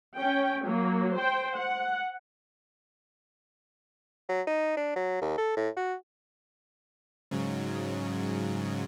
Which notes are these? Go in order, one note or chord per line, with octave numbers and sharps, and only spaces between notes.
C#4 G5
F#3 A#3
C5 G5
F#5
F#3
D#4
D4
F#3
D#2
A4
A2
F#4
G#2 C#3 F#3